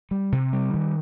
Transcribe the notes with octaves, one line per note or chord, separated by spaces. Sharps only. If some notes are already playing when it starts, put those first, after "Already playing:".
G3
C3
G3
D#3